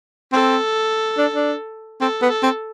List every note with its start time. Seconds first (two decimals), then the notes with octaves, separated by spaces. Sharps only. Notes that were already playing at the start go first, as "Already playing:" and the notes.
0.32 C4 A4
1.18 D4
1.34 D4
2.01 C4 A4
2.22 B3
2.29 A4
2.43 C4